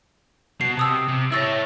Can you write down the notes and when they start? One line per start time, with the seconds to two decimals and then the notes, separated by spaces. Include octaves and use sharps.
0.61 B2 C7
0.77 C3 A5 D#6 E6
1.09 C3
1.32 E4 C#5 E6 A6 A#6